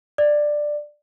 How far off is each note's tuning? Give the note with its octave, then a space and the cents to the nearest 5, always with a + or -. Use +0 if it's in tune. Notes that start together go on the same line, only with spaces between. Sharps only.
D5 +10